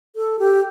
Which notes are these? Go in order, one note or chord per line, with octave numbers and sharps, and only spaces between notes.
A4
G4